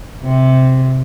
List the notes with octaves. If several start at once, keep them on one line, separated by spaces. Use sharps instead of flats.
C3